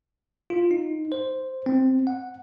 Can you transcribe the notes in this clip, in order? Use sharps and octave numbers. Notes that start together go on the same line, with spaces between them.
F4
D#4
C5
C4
F#5